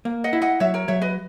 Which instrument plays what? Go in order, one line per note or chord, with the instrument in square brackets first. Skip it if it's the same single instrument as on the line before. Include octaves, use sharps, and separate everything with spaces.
[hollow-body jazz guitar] A#3
[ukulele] D#5 F#5
[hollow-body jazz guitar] E4
[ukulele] D#5 F#5
[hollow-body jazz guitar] F#3 [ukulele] C#5 E5
[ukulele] A#4 C#5
[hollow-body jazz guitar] F#3 [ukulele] C#5 E5
[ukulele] B4 D#5